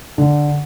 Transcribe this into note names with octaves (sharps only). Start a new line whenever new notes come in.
D3